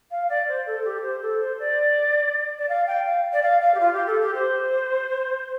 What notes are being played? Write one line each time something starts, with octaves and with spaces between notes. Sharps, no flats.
F5
D5
C5
A4
G4
C5
A4
C5
D5
D5
F5
G5
F5
D5
F5
F5
G4
F4
G4
A4
G4
C5